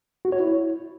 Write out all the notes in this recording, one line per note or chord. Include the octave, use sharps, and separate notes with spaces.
F#4
C#5
E4